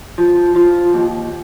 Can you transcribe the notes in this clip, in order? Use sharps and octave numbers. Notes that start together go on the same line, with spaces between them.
F3
F3
D#2